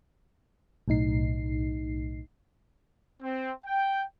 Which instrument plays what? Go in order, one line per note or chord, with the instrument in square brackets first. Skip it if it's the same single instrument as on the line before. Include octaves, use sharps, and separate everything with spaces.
[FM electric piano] B1 A2 D#4 C7
[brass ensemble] C4
G5